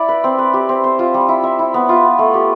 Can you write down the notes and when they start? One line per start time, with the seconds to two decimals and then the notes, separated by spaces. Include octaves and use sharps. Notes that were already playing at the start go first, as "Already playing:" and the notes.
Already playing: E4 D5
0.09 B4
0.24 C4
0.39 B4
0.54 G4
0.69 C4
0.84 C5
0.99 F4
1.14 G3
1.29 E4
1.43 E5
1.59 E4
1.74 B3
1.89 F4
2.04 B3
2.19 A3
2.34 G4